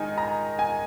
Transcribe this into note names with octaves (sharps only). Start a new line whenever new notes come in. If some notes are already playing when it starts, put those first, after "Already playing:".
Already playing: D#3 G#3 D#4 G#5
A#5
G#5